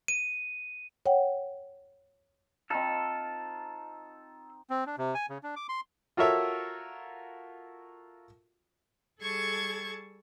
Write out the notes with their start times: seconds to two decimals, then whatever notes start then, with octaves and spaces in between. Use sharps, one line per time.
0.08 D#7
1.06 C#5 F#5 G5
2.70 C4 D#4 F4 A4
4.70 C4
4.86 D4
4.98 C3
5.14 G#5
5.30 C#3
5.43 D4
5.56 D6
5.69 C6
6.17 F4 F#4 A4 A#4 C#5 E5
9.19 G3 G#4 A4 A5 C#6 G#6